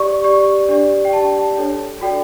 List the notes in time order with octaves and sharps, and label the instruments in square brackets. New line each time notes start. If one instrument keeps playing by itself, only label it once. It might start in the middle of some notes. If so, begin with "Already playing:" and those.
Already playing: [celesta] G4 D5 C#6
G4 D5
D4 G4 D5
G5
G4 D5 A5
D4 A4 C#5
F#4 A4 D5 G5